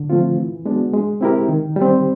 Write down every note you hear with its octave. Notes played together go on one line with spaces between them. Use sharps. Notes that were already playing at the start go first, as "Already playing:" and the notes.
Already playing: D3
F3 A3 C4 F4
E3
G#3 B3 D4 F#4
G#3
C4 E4 G4 A#4
D#3
G3
C4